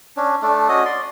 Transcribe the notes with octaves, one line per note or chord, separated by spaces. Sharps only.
C#4 D4
A3 D4
C#4 F#4 D#5
D5 C6